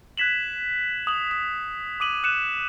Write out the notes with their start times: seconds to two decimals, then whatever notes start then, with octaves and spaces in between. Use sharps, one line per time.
0.18 F#6 G#6 B6 E7 F#7
1.07 D#6 F#7
1.31 D#6 B6
2.00 D6 D#6 D#7 F#7
2.24 F#6 C#7 D#7 E7